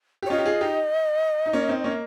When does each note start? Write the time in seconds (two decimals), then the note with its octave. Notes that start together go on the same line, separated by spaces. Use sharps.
0.22 G4
0.26 C#5
0.30 C#4 F4 D#5
0.38 G4
0.46 F4 G#4
0.61 D#4 G4
1.46 D#4
1.53 A#3 C#4
1.69 C4 D#4
1.84 A#3 C#4